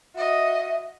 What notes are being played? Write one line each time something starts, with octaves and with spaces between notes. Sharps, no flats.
F#4 D#5 E5